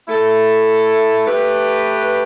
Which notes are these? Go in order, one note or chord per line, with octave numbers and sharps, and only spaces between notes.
A3 E4 A4
A3 G4 B4